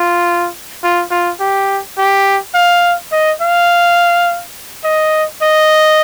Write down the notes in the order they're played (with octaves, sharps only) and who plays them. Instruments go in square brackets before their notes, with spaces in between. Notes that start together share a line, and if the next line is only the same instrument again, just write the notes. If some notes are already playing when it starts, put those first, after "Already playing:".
Already playing: [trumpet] F4
F4
F4
G4
G4
F5
D#5
F5
D#5
D#5